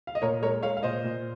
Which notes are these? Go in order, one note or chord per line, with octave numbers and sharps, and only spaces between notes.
F5
D#5
A#2 A#4 C#5
G#3 A#4 C#5
G#3 C#5 F5
F5
A#2 C5 D#5
A#2